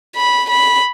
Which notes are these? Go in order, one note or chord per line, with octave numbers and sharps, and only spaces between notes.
B5
B5